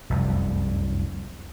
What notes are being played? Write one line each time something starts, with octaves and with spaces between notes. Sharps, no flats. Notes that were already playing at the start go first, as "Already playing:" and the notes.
F1 C2 F#2